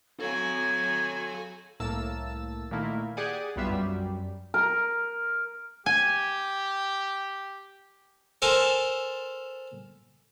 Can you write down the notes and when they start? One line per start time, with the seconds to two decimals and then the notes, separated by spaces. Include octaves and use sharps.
0.20 F#4 A4 C#5 F5 G#5 A#5 G#6
1.80 C2 A2 A#3 A5 E6
2.71 A#2 D#3 A3 A#3 E4
3.17 G4 G#4 D5 F#5 G#5
3.56 B1 G2 G3 B3 F4 E5
3.71 F#2 G3
4.54 A#4
5.86 G4 G#5
8.42 A4 A#4 C5 G#5 A5